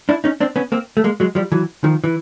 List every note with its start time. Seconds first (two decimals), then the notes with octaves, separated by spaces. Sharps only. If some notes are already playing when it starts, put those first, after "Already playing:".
0.09 D4 E4
0.24 C#4 D#4
0.41 C4 D4
0.56 B3 C#4
0.72 A#3 C4
0.97 A3
1.04 G#3 A#3
1.20 F#3 G#3
1.35 F3 G3
1.52 E3 F#3
1.84 D#3 F3
2.04 E3